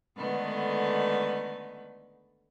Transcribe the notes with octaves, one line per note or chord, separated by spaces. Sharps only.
D3 D#3 G#3 A3 B3 B4